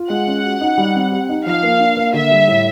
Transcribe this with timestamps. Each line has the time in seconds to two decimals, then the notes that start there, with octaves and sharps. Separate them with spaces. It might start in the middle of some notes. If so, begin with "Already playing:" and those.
Already playing: F4
0.10 G#3 F#5
0.27 C#4
0.44 F#4
0.61 D#4
0.78 G3
0.95 C4
1.12 G4
1.29 D#4
1.46 F3 F5
1.63 A#3
1.80 D4
1.97 A#3
2.14 D3 E5
2.31 G3
2.48 A2